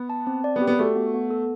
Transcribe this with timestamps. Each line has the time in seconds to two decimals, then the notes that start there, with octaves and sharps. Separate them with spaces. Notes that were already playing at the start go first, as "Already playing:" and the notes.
Already playing: B3
0.10 A5
0.27 C4
0.44 D5
0.56 B3
0.62 G4
0.67 B3
0.79 A3 F#4
0.96 B3
1.14 B3
1.31 A4